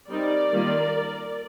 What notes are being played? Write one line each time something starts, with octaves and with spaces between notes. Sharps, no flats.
G3 C4 D#4 A#4 D5
D#3 G3 A#3 F4